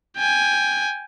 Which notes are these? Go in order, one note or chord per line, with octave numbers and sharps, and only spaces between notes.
G5 G#5